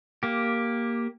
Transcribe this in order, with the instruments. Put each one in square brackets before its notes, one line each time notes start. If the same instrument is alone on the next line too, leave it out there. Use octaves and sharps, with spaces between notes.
[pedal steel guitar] A#3 G4